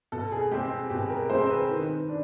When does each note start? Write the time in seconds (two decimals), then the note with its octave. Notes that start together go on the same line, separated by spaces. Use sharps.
0.12 B2 A4
0.32 G#4
0.51 G#3 C4 G4
0.90 B2 G4
1.10 A#4
1.30 G#3 C4 C5
1.50 B4
1.69 D#3
2.09 D4